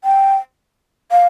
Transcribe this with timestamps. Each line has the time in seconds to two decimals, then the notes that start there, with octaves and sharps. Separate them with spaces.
0.04 G5
1.11 F5